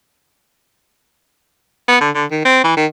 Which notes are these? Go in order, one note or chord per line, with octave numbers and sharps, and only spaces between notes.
B3
D3
D3
D#3
C4
E3
D#3